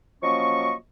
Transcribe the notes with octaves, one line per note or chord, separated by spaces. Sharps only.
F3 F#3 A#3 C#4 D#5 C#6